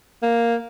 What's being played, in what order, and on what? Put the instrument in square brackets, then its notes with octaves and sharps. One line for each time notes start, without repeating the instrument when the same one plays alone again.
[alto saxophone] A#3